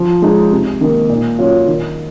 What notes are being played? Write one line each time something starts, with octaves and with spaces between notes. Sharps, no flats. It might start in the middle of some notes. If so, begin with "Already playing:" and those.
Already playing: F3
G#3 D#4 G#4
C3
D#3 A#3
A#2
F#3 C#4 F4
D#3